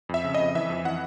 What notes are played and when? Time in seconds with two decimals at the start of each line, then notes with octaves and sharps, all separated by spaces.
0.09 F2 E5
0.24 C#3
0.34 D#5
0.40 F2
0.55 E3 E5
0.70 F2
0.85 E3 F#5